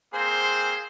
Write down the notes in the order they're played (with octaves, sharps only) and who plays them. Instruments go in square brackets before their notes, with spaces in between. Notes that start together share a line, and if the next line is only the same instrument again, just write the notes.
[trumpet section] A#3 C4 C5 [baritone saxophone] G#4